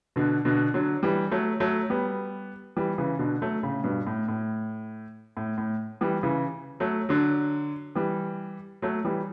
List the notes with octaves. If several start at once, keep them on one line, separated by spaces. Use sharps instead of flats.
B2 D3
B2 D3
D3 F#3
E3 G3
F#3 A3
F#3 A3
G3 B3
E3 G3
C#3 E3
B2 D3
F#3 A3
A2 C#3
G2 B2
A2
A2
A2
A2
E3 G3
C#3 E3
F#3 A3
D3 F#3
E3 G3
F#3 A3
E3 G3